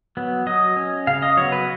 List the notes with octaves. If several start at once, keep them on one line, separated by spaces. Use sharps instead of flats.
F#3 B3
F#3 D#5
C#4
C#3 F5
D#5
F#3 B3 C#5
B4